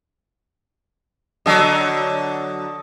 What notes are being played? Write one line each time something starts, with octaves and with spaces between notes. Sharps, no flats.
D3 F#3 D#5 A5